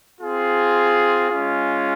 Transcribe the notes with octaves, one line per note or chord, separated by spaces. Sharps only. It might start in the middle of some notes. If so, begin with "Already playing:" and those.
C4 F4 G#4
G#3 C#4 F4